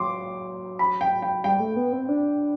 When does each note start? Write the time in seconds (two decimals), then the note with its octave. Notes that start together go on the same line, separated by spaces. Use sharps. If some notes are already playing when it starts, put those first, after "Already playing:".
Already playing: F#3 C6 D6
0.79 B5
1.01 G5
1.22 G5
1.44 G3 G5
1.60 A3
1.76 B3
1.92 C4
2.09 D4